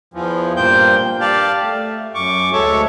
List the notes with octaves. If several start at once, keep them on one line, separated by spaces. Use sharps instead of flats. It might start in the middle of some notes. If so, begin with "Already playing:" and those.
E2 E3 F3
G2 A#2 A#3 C5 G5 G6
G4 D5 F5 A5
A3
F#2 C#6 D6
D2 G#3 A4 C#5 E5 C#6